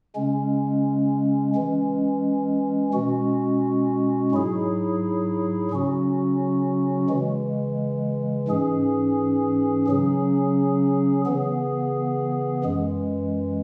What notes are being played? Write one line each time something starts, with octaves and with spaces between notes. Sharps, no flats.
C#3 G#3 C#4
E3 G#3 C#4
B2 G#3 C#4 F#4
G#2 F#3 E4 G#4
C#3 F#3 C#4 F#4
C#3 E3 G#3
G#2 E3 C#4 G#4
C#3 F#3 C#4 G#4
C#3 E3 B3 G#4
F#2 E3 G#3